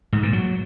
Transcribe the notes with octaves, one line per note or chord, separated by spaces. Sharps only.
G#2
A#2
F#3